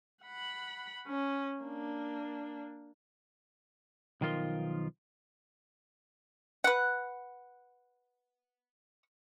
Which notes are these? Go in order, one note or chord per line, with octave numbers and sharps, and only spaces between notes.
F#5 B5
C#4
A#3 D4
B1 D#3 F3 F4 A#4 C6
B4 F#5